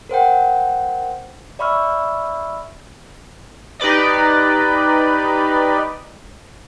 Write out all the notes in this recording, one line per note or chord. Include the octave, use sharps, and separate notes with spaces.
A#4 C5 F#5 G5
D5 E5 B5 C#6 E6 F6
D#4 G4 B4 D5 D#5